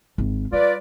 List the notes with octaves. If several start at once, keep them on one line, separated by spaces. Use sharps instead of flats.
G#1
G3 F4 B4 D5